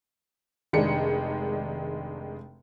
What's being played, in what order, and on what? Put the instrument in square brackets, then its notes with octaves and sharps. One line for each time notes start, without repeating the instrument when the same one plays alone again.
[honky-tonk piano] F1 D#3 G#3 D4 C#7